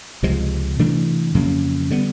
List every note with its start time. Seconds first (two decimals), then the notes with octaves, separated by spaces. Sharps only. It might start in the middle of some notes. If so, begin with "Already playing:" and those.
0.23 C#2 C3 F3 G#3
0.79 C3 E3 A3 D4
1.34 F2 C#3 F#3 A#3
1.90 D3 G3 B3